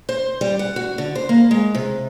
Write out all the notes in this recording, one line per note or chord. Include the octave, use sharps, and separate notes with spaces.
C5
G3
F#5
F#4
D3
C5
A#3
G#3
C3